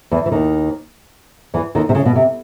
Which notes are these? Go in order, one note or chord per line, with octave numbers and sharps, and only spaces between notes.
E2 E3
E3
D#2 D#3
E2 E3
D#2 D#3
C3
C#3
B2
C3